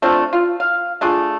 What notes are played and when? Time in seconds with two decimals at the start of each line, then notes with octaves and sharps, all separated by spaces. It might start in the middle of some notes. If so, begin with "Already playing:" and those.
0.02 A3 C4 D4 F4
0.33 F4
0.60 F5
1.01 A3 D4 F4 G#4